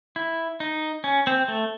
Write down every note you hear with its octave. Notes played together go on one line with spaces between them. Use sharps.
E4
D#4
C#4
C4
A3